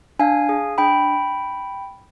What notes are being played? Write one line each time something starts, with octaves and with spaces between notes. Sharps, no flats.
D4 F5 G#5
G#4
D4 G5 B5